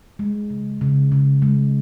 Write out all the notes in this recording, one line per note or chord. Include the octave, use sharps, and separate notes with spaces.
G#3
C#3
C#3
C#3
G#3